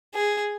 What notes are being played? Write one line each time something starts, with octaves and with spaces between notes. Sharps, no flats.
G#4